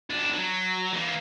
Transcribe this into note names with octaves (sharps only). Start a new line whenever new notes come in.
C#2 D4
F#3
E3 A#3